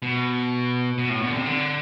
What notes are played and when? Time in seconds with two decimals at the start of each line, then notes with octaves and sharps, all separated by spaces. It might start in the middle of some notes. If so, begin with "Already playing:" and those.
0.02 B2
0.98 B2
1.10 A2
1.22 B2
1.28 D3
1.34 C3
1.46 D3